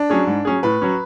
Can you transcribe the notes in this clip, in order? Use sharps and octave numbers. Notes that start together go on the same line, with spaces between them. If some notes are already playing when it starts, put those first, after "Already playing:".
Already playing: D4
F#3 C#4 G#4
G#2
F#3 C#4 G#4
A2 B4
F#3 C#4